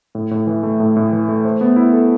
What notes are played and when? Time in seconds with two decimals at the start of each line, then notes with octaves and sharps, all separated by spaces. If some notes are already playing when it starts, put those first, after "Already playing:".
0.15 A2
0.31 A2
0.47 E3
0.63 A3
0.80 A2
0.96 A2
1.12 E3
1.28 A3
1.45 C5
1.61 B3
1.76 E4
1.93 A4